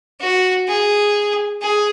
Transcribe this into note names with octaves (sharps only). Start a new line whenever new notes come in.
F#4
G#4
G#4